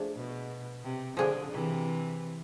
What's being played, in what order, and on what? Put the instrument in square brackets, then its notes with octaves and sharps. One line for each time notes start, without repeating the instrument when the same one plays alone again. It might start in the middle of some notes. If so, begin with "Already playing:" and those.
Already playing: [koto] F3 A3 D4 G#4
[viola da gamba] B2
C3
[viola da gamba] D3 [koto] F3 A3 D4 G#4
[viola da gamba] C3 E3